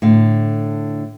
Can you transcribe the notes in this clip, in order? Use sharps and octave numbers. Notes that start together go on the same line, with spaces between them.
A2 D3 F5